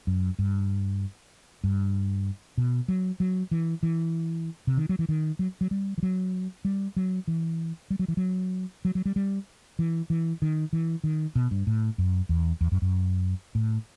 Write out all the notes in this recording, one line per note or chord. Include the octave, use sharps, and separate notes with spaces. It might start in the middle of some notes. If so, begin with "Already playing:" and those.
F#2
G2
G2
B2
F#3
F#3
E3
E3
C3
D#3
F#3
E3
D#3
F#3
F#3
G3
E3
F#3
G3
F#3
E3
G3
F#3
E3
F#3
F#3
F#3
G3
G3
E3
E3
D#3
E3
D#3
B2
G2
A2
F#2
E2
E2
F#2
F#2
A2